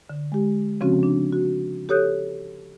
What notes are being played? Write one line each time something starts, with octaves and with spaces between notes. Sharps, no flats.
D3
G#3 G4
C#3 F3 C4 C#4 F#4
D4
F#4
G4 A4 C#5 D#6 F#6 G6